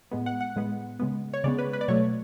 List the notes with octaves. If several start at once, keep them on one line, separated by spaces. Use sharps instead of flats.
A2 G#3 B3
F#5
F#5
A2 G#3 B3
C#3 G#3 B3
C#5
C#3 G#3 B3 D5
B4
B4
D5
B2 F#3 A3 C#5